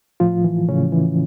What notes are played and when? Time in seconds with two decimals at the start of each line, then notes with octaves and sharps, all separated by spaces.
0.20 A2 F3 F4
0.44 E3
0.69 A2 C#3 C#4
0.92 E3